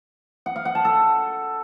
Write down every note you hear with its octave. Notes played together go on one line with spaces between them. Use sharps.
F#5
F5
F#5
A5
A4